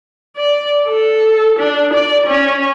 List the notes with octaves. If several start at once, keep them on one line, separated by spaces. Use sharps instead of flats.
D5
A4
D4
D5
C#4